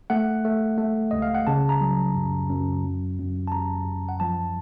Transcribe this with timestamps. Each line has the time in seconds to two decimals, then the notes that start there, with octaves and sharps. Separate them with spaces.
0.10 A3 F#5
0.45 A3
0.78 A3
1.11 C#2 D#5
1.22 F5
1.35 F#5
1.47 C#3 A5
1.69 A#5
1.81 F#3
2.15 F#2
2.49 F#2
2.84 F#2
3.18 F#2
3.48 A5
3.52 F#2 A#5
3.86 F#2
4.09 F#5
4.20 F3 A5